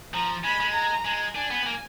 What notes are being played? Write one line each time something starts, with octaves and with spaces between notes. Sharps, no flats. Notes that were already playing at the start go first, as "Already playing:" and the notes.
F3 A#5
G#3 B5
G#3
A#5
G#3
D4 G#5
B3
A#3